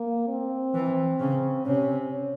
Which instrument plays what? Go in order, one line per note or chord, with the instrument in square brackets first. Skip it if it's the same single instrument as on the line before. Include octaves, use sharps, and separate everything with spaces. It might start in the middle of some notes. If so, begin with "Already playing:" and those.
Already playing: [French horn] A#3
C4
[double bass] E3
C#3
[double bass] C3 [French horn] C#4